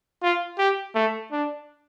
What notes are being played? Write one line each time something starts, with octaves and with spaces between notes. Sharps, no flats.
F4
G4
A3
D4